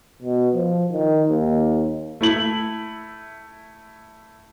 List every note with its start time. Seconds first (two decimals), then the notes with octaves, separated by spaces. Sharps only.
0.22 B2
0.54 F3
0.91 D#3
1.30 D#2
2.21 A3 E4 F#7